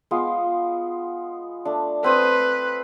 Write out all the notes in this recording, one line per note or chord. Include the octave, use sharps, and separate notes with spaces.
G#3 B3 F4
A3 D4
C4 B4 C5 D#6